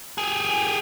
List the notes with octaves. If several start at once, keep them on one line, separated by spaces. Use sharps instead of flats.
G4 G#4